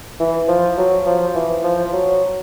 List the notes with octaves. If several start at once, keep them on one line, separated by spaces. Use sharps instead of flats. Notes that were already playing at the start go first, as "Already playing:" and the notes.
E3
F3
F#3
F3
E3
F3
F#3